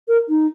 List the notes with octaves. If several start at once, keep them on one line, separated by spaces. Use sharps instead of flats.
A#4
D#4